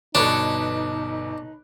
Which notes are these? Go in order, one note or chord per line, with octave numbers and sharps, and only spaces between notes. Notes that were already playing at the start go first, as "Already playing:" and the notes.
G1 B2 D4 D#4 A4 B4 C#5 F#6